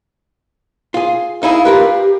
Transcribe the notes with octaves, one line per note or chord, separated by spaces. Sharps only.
F4 G#4
D#4 E4 G#4 F5
F4 G4 A#4 B4